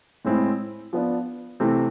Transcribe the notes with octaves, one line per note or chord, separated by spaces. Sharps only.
A2 G#3 C4 E4
F3 B3 D4
C3 E3 A3 C4